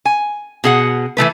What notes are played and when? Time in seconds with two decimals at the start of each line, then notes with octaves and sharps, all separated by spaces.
0.05 G#5
0.64 B2 G#4 F#5
1.17 E3 F3 A3 B4